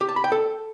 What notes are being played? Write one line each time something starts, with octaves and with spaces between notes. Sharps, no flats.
G4
A5
B5
G5
A4